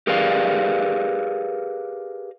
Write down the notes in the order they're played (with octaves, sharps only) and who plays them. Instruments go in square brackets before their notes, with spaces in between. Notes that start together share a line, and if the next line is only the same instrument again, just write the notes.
[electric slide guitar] G4 G#4 A#4 B4 D5 F5